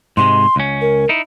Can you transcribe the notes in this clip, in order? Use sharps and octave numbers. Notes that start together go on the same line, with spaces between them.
G#2 C3 G#3 C6
C#2 C#4
A#4
D#4 E4